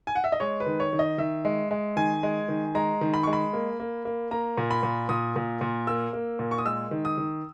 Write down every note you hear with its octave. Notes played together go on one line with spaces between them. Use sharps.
G#5
F#5
E5
D#5
G#3 C#5
B4
D#3
C#5
D#3
D#5
D#3 E5
G#3
G#3
D#3 G#5
G#3
D#3
G#3 A#5
D#3
B5
G#3 C#6
B5
A#3
A#3
A#3
A#3 A#5
A#2
B5
A#2
A#2 D#6
A#2
A#2
A#3 E6
A#3
A#2
C#6
D#6
G#3 E6
D#3
D#6
D#3